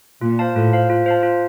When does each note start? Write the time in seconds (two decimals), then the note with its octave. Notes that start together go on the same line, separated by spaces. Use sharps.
0.21 A#2 F4
0.39 C5 F5 A5
0.56 A2 F4
0.72 C5 F5 A5
0.90 F4
1.06 C5 F5 A5
1.23 F4